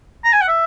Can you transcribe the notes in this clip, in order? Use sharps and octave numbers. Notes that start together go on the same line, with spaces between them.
A#5
G#5
F#5
E5